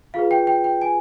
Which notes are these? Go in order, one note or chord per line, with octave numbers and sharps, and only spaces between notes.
F4 G#4 B4 F5
G5
G5
G5
G#5